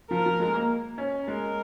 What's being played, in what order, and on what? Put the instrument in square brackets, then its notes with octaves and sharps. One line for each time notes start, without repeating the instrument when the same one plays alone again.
[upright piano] F3 [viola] A#4
[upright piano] F3
G#3
A#3
C#4
[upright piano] G#3 [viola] A#4